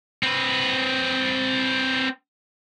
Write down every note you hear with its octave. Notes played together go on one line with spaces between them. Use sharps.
C4 B4